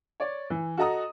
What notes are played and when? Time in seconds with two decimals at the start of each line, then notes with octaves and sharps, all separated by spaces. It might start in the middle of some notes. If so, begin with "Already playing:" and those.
0.20 C#5 D5
0.50 E3
0.77 F#4 A4 D#5 A#5 D#6